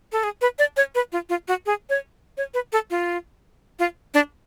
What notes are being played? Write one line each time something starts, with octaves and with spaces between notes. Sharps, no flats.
A4
G#4
B4
D5
C#5
B4
F4
F4
F#4
G#4
C#5
C#5
B4
A4
F4
F4
D4